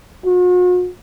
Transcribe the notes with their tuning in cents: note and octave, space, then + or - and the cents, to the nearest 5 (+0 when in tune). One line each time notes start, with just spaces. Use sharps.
F#4 -45